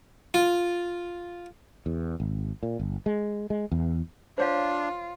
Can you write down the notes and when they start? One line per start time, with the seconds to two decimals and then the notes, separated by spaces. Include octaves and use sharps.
0.34 F4
1.86 E2
2.20 G#1
2.63 A#2
2.79 G1
3.06 G#3
3.50 G#3
3.72 E2
4.38 D4 F4 C5 C#5 F5